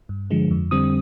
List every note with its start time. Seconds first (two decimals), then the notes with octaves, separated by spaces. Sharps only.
0.09 G2
0.30 D3 F3 G#3
0.51 F2
0.71 D3 G3 C4 D#6